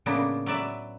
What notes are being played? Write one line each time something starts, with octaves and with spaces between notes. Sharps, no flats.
A2 C#3 A#3 B3 D4
F#3 B4 D5 E5